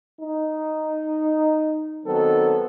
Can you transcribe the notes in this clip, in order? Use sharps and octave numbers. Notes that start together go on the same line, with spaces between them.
D#4
D#3 F#3 B3 C4 A4